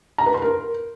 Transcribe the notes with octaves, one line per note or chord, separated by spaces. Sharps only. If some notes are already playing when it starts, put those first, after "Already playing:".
A#5
B4
C6
A#4